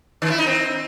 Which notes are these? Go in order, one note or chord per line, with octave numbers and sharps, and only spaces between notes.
D#3
E4
D#4
C4